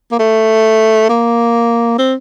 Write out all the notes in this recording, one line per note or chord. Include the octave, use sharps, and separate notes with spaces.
A#3
A3
A#3
C4